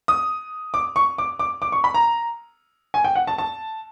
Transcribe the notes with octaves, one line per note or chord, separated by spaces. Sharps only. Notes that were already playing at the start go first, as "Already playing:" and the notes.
D#6
D6
C#6
D6
D6
D6
C#6
B5
A#5
G#5
G5
F#5
A5
A5